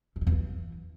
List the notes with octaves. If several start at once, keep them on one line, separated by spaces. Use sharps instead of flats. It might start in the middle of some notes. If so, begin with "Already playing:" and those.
G2
D3
E2
E3